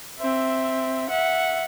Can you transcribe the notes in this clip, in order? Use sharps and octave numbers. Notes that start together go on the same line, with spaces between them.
C4 E5
E5 F#5